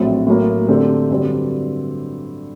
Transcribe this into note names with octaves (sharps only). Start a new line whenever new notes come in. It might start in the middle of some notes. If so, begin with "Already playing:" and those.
Already playing: A#1 A2 F#3 C4
A2 F#3 A#3
D3 A3 C4 G4 C5
G2 D3 F#3 C4 G4